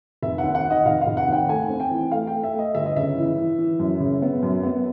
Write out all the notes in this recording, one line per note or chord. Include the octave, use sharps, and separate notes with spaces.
F1 E5
F#5
D#2
F#5
D#3
D#5
F1 F5
F5
F1
F#5
D#2 G5
A3 G#5
C4
G5
E3
A3 F5
G5
A3
E5
A3
D#5
G1 E5
D#5
C#3 E5
E3
E3
E3
F#2
C#3
B3
F#2
B3